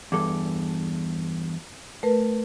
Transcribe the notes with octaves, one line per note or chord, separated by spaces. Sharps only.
E2 G2 A4 D6
A3 A#4 B4